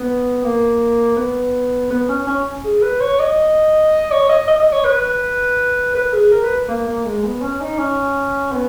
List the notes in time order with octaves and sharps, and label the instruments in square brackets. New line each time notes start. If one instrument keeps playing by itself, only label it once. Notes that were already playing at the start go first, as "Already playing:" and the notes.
Already playing: [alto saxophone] B3
A#3
B3
B3
C#4
C#4
G#4
B4
C#5
D#5
C#5
D#5
D#5
D#5
C#5
B4
B4
G#4
A#4
B4
A#3
A#3
G#3
B3
C#4
D#4
C#4
B3